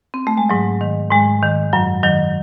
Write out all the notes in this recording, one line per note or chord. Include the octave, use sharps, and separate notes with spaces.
C4
A3
G#3
G#2 F#3
D#3
G#2 G#3
D#3
F#2 F#3
D#3 F#3